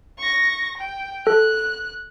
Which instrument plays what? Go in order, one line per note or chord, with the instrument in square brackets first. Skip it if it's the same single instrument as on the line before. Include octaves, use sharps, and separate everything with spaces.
[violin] C#6 A#6
G5
[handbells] A4 [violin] F#6